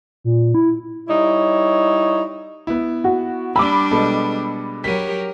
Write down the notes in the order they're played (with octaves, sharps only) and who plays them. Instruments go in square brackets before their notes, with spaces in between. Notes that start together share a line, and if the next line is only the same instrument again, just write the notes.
[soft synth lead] A#2
E4
[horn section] G3 D#4 E4 C#5
[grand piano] B3 E4
[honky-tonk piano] F#4
[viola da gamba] G3 D4 [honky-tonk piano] B5 D6 [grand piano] E6
[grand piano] B2 G#3 A4
[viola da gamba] F#3 G4 A#4 [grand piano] B6 D#7